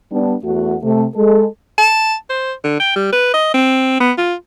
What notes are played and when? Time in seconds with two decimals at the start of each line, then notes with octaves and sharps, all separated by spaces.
0.11 G3 B3 D4
0.43 E2 A3 F#4
0.83 C3 A3
1.15 G#3 A4
1.78 A5
2.30 C5
2.64 D3
2.80 G5
2.96 G3
3.13 B4
3.34 D#5
3.54 C4
4.00 B3
4.18 F4